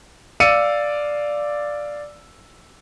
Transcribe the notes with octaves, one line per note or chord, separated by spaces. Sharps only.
D5 F5 E6 C#7 D#7